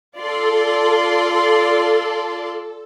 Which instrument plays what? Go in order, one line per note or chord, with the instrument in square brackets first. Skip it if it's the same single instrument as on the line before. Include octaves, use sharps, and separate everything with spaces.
[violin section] F4 D5 C6 [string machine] A4